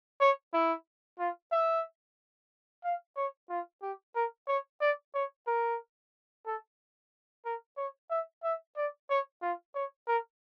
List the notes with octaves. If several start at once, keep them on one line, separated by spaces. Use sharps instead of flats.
C#5
E4
F4
E5
F5
C#5
F4
G4
A#4
C#5
D5
C#5
A#4
A4
A#4
C#5
E5
E5
D5
C#5
F4
C#5
A#4